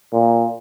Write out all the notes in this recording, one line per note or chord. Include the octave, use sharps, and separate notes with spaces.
A#2